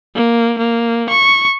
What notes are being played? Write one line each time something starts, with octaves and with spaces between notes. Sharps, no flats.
A#3
A#3
C#6